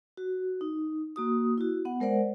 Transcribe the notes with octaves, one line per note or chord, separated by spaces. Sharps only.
F#4
D#4
A#3 F#4 D#6
E4 F#4
B3 F#5
G#3 A#4 C5 D5 F#5